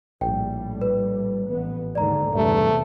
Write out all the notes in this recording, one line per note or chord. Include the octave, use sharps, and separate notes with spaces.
A#1 A2 G3 G5
B4
A1 B3
D#2 G#2 D3 D5 A#5
B1 E2 G2 C3 A3